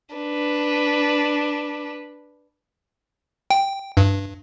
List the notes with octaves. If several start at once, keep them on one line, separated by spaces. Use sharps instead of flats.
D4 B4
G5
G2